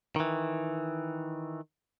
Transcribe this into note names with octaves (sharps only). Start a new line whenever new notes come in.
D#3 E3